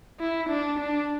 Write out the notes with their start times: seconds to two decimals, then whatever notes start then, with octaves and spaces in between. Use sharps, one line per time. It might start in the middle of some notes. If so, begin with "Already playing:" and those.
0.20 E4
0.49 D4
0.79 D4